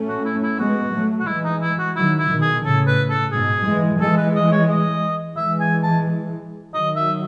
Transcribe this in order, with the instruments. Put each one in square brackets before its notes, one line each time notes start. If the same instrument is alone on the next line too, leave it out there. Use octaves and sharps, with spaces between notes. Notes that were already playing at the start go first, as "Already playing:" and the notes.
Already playing: [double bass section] A3 C#4
[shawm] F#4
E4
E4
[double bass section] G#3 B3 [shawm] F#4
[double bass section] F#3 A3
[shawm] F#4
[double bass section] E3 G#3 [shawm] E4
[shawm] D#4
E4
F#4
[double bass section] D#3 F#3 [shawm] E4
[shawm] E4
[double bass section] B2 D#3
[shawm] G#4
[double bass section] A2 C#3 [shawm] A4
[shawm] B4
A4
[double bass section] G#2 B2 [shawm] G#4
[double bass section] E3 G#3
[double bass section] E3 G#3 [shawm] A4
[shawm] B4
D#5
C#5
D#5
[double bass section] E3 G#3 [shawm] E5
[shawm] G#5
A5
[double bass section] D#3 F#3 [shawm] D#5
[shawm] E5